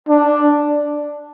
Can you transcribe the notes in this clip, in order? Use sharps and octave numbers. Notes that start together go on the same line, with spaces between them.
D4